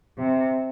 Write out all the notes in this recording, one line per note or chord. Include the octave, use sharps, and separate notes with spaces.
C3